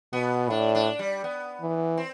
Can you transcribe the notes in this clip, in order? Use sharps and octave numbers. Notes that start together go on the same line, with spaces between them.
B2 B3
A2 D4
D4
G3
B3
E3
C4